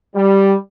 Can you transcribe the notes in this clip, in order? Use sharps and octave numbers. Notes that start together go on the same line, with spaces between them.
G3